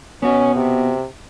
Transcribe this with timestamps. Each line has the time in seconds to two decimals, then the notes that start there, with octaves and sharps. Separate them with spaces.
0.22 B3 C#4 F#4
0.56 C3